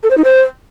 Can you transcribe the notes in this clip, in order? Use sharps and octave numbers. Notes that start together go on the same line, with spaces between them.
A4
C5
D#4
C5